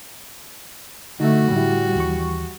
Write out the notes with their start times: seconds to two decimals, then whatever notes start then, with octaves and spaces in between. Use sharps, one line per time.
1.20 D3 A3 D#4 F#4 E5
1.52 A2 G3 E4
1.96 D#2 E3 C#6